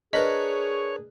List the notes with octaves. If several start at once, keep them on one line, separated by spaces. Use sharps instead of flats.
D4 G#4 A#4 B4 C#5 D#5 B6 F#7